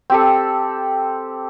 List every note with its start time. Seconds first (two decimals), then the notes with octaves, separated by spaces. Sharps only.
0.10 C4 G4 A4